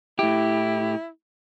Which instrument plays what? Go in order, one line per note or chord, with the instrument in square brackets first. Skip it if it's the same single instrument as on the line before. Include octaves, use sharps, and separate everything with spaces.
[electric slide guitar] A2 G4 [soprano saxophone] E4